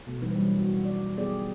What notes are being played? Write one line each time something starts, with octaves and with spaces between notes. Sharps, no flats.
B2 A3
E3 G3 C4 D#4 B4
E3 F#3 G3 A#3 D4
G3 F#4
D5
D#3 F#3 B3 G4 G#4 D5